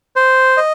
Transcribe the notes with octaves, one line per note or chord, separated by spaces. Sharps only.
C5
D#5